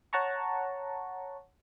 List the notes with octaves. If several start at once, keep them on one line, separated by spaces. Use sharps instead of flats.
C#5 F#5 A5 A#5 C#6